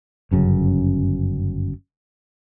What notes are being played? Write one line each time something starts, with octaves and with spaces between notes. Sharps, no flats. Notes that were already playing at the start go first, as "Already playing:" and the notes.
G1 F#2 C#3